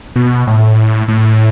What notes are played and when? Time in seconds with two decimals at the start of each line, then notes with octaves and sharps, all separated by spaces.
0.16 B2
0.47 A2
1.08 A2